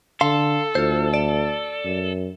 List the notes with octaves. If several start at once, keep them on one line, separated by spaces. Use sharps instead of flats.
D3 A4 F5 C6
D2 F4 C5
D5
F#2